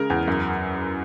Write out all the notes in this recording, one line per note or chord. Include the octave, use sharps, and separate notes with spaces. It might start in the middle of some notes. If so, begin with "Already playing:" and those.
Already playing: C#3 G#3 A#4
E2
F#2